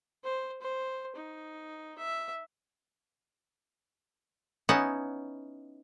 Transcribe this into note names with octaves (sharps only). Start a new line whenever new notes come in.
C5
C5
D#4
E5
B3 C#4 D#4 E4 F#5